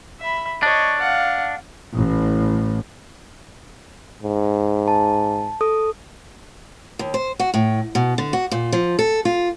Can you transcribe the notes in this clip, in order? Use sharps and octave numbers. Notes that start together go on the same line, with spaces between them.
E5 B5
D4 C#5 D#5
F5 F#5
A1 A2
G#2
A5
A4 D#6
D#2
C5
F#4
A2
B2
D3
F#4
A#2
F3
A4
F4